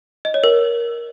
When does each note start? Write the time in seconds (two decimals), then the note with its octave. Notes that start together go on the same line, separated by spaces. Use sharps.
0.25 D#5
0.34 C#5
0.44 A#4